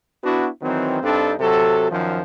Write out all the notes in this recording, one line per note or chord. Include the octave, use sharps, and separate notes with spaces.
B3 D4 E4 F#4
D#3 E3 F#3 C4
G2 C4 D4 D#4 A4
C3 F#3 F#4 A4
F#2 D#3 F3